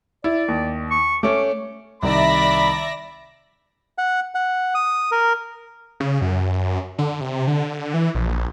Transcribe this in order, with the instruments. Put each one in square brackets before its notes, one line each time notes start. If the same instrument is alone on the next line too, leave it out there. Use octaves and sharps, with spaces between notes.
[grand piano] E4 [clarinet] D5
[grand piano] D#2
[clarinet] C#6
[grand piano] A3 C#4 [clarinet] D6
[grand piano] C2 D#3 [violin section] D5 E5 A#6 [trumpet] B5
[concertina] F#5
F#5
D#6
A#4
[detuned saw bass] C#3
F#2
D3
C3
D3
E3
A#1